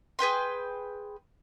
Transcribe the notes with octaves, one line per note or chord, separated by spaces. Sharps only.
G#4 B4 G5 C6